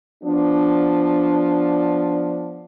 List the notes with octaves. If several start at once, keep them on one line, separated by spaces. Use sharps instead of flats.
F3 B3 D4